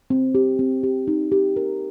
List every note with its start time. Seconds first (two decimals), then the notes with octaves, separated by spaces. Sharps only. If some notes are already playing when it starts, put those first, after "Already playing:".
0.10 C4
0.35 G4
0.59 C4
0.83 G4
1.07 D#4
1.32 G4
1.56 A#4